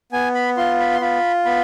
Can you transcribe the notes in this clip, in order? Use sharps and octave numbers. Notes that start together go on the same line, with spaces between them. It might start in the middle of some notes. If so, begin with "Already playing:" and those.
B3 G#5
B5
F4 C6
B5
C6
F4 B5
B3 B5